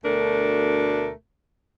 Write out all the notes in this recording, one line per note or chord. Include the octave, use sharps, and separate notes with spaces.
D2 B2 A3 D4 A#4